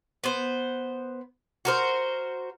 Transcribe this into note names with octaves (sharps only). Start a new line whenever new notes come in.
B3 C5
F#4 A#4 C5